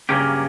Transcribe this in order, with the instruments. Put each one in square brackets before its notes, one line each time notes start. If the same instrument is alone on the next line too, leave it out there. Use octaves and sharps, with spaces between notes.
[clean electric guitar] G2 F#3 A#3 C#4 G4 [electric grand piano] C#3